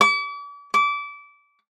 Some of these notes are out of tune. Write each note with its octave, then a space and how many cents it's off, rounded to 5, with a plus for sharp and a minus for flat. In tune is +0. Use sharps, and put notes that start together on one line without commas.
D6 -40
D6 -25